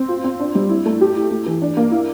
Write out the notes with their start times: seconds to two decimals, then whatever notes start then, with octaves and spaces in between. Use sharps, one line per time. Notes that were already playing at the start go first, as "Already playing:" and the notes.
Already playing: C4
0.08 F4
0.24 C4
0.40 D4
0.55 G3
0.69 E4
0.86 A3
1.01 G4
1.16 E4
1.31 A3
1.46 E3
1.62 D4
1.77 A#3
1.91 E4